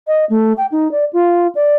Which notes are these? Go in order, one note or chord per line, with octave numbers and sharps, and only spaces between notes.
D#5
A3
G5
D#4
D5
F4
D5